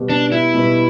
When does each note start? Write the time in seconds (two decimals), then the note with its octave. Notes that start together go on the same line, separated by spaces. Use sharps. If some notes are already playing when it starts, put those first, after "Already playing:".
Already playing: B2 G3 B3
0.10 D4
0.32 E4
0.54 B2 G3 B3